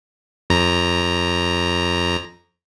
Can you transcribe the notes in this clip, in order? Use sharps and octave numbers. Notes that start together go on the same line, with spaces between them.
F2 A#5